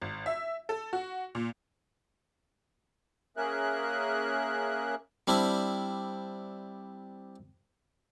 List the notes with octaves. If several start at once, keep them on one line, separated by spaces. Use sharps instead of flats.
G#1
E5
A4
F#4
A#2
A#3 C#4 G#4 A#4 E5 F#6
G3 C4 D4 E4